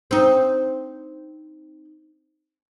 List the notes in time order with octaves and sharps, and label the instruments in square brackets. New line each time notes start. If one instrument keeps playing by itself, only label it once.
[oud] C4 D#4